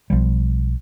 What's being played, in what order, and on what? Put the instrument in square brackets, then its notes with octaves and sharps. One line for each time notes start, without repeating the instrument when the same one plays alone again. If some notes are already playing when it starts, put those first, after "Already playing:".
[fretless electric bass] B1 F3 G3